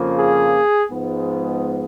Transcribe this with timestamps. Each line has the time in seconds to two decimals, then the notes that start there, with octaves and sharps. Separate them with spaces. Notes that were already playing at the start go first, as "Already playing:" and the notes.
Already playing: F2 C#3 F3 A#3
0.17 G#4
0.90 G#2 F3 G#3 B3